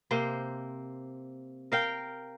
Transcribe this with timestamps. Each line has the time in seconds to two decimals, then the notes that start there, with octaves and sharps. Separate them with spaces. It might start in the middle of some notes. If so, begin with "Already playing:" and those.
0.11 C3 A#3 C5
1.72 A#4 F5 G5